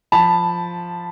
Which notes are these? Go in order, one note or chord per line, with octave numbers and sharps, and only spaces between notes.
F3 A5 B5